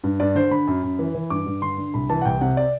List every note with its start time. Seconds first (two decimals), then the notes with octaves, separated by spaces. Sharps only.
0.04 G2
0.20 G2 D5
0.35 D3 C5
0.51 D3 B5
0.67 F#2
0.83 F#2
0.99 E3
1.15 E3
1.30 G2 D6
1.46 G2
1.62 D3 C6
1.78 D3
1.94 C2 B5
2.09 E3 A5
2.22 F#5
2.25 C2 G5
2.41 C3 F#5
2.57 D5